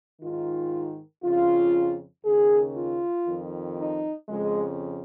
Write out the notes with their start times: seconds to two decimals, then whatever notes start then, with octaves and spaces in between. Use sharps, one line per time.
0.20 G#2 D#3 F4
1.23 F2 C#3 F4
2.25 D#2 C#3 G#4
2.76 F4
3.27 F2 D#3
3.77 D#4
4.29 F2 C#3 G#3